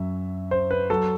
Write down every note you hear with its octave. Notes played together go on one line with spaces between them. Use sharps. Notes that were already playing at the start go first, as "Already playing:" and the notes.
Already playing: F#2 F#3 E5
C5
B4
F#3 A4